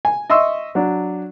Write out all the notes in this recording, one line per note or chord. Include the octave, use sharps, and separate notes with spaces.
G#5
D#5 E5 C6 C#6 E6
F#3 D4